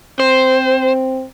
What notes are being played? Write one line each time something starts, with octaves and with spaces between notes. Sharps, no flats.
C4 C5